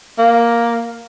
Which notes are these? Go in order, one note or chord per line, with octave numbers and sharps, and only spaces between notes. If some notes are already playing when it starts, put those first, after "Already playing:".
A#3